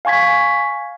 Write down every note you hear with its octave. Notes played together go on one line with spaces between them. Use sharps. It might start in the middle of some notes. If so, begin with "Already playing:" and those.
F5 G#5 C#6 G#6 B6